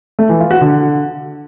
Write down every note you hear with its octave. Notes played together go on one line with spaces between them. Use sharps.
A3
E3
F4
F#4
D3